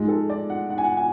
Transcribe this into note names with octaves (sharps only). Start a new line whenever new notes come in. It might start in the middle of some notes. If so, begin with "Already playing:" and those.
Already playing: G#2 F3 G#3
A4
D5
F#5
F#5
G#5
F#5
G#5